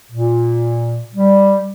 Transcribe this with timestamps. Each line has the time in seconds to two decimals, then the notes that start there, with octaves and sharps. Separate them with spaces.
0.11 A#2
1.15 G3